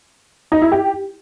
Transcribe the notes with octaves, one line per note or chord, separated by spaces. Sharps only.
D#4
E4
G4